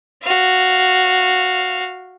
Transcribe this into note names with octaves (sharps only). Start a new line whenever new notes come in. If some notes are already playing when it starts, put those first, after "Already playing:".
F#4 F5